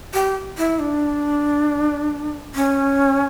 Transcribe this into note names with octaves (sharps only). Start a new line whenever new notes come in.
G4
E4
D4
C#4